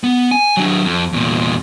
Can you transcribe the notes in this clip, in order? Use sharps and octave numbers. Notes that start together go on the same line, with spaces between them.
B3
G#5
F#3 D4
F2
E2 A#2